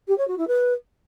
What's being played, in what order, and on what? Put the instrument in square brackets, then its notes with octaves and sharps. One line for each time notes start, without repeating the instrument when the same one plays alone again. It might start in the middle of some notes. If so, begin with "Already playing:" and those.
[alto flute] G4
C#5
F#4
E4
B4